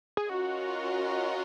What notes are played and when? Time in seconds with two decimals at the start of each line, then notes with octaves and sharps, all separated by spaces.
0.17 G#4
0.29 C#4 F4 F#4 A#4 D#5